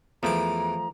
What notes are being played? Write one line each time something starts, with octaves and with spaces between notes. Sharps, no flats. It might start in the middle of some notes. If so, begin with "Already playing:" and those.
E2 E3 F3 A3 A#5 D6